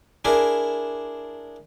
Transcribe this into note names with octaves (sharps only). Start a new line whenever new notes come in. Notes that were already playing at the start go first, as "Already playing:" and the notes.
D4 E4 G#4 A#4